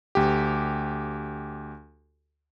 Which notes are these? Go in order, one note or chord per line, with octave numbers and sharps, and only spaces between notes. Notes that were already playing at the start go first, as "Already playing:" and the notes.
D2 G4